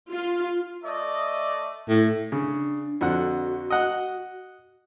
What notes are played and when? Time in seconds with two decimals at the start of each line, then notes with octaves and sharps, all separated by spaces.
0.13 F4
0.84 A3 D5 D#5
1.89 A2
2.32 C#3 D4
3.01 F2 D3 F#4 F#5
3.70 D#5 F#5